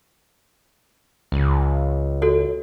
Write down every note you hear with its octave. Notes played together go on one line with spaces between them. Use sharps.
C#2
F#4 A4 C#5